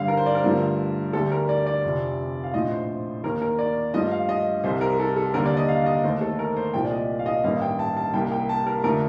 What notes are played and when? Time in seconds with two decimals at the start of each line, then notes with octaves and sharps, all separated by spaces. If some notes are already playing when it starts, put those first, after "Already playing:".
Already playing: G2 D3 G3 F5
0.08 A#4
0.17 C5
0.26 D5
0.35 A#4
0.44 G2 D3 F3 A3
1.13 D2 D3 G3 A4
1.31 A#4
1.49 D5
1.66 D5
1.84 F1 F2 C3
2.44 F5
2.54 A#1 A2 F3 D#5
2.71 C5
3.24 D#2 D#3 A#3 A#4
3.42 A#4
3.59 D5
3.94 G2 F3 A3 D#5
4.11 F5
4.29 D#5
4.64 C2 C3 G3 C5
4.81 A#4
4.99 A4
5.16 A4
5.34 D#2 D3 G3 A#3 A#4
5.45 D5
5.57 D#5
5.68 F5
5.86 D#5
6.04 D#2 D#3 A3 C5
6.21 A4
6.39 A#4
6.57 C5
6.74 C2 A#2 F3 G5
6.85 D5
6.91 D#5
7.19 F5
7.26 D#5
7.44 A1 G2 D#3 A#3 F5
7.62 G5
7.79 A5
7.97 A5
8.14 C2 C3 G3 A#3 G5
8.32 G5
8.49 A5
8.67 A#4
8.84 F2 D3 A3 A#4